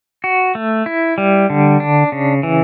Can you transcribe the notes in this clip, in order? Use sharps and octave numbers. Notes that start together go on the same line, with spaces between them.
F#4
A3
E4
G3
D3
D4
C#3
E3